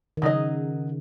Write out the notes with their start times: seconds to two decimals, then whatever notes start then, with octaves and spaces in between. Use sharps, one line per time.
0.17 D#3
0.22 C#3 F#3 D#4 G#4 D#5